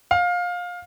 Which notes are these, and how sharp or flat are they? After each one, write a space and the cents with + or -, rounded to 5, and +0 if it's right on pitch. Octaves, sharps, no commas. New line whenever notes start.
F5 +20